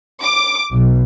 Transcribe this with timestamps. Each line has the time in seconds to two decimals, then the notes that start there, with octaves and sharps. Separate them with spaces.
0.21 D6
0.73 B1